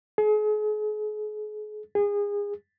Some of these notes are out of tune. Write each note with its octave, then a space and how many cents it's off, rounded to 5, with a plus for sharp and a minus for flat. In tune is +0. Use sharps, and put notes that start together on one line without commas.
G#4 +40
G#4 -25